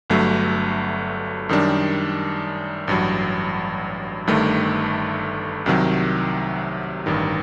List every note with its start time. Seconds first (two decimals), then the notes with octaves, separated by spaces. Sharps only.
0.10 G1 G2 F#3 A3
1.49 F#2 D#3 G3 D4
2.88 A1 G2 F#3
4.27 G1 G2 D#3 A3
5.66 C2 C3 D#3 F#3
7.06 A1 G2 D#3